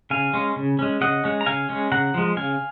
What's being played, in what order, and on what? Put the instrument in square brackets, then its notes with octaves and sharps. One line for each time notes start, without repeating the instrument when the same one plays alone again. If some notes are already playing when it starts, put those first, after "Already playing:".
[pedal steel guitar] C#3 F5 G#5
G#3 C#4
C#3
G#3 C#4
C#3 D#5 F#5
G#3 C#4
A#5
C#3 F5 G#5
G#3 C#4
C#3 F#5 A#5
F3 G#3
C#3 F5 G#5